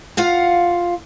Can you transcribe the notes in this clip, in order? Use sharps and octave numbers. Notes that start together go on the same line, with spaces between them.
F4 F5 F#5